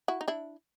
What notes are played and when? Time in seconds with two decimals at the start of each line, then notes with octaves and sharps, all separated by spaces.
0.08 E4 F#4
0.21 D#4
0.28 D4 E4